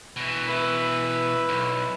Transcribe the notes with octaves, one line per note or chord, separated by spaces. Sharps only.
B2 E3
E4 B4
B1